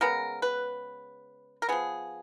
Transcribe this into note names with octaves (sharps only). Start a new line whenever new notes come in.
C#3 G#3 B3 A#4
B4
A#4
F3 B3 G#4